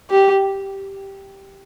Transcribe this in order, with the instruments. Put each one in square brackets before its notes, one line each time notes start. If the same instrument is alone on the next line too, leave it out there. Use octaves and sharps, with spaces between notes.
[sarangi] G4